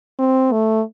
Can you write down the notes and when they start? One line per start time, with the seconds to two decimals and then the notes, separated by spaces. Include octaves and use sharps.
0.19 C4
0.52 A3